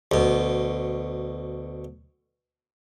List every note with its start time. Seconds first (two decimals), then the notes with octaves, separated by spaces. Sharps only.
0.11 D2 B2